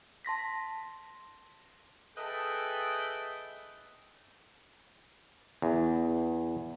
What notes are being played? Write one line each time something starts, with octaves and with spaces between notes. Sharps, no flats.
A5 C6 A#6 B6
G#4 A4 B4 D#5 E5 G5
E2